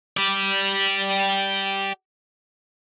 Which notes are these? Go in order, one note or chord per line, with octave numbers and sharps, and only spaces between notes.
G4 D5